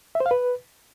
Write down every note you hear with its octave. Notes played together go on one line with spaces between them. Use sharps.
E5
C5
F5
B4